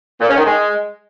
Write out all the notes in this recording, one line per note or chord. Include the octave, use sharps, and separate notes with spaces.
A#2
C#4
D#3
G#3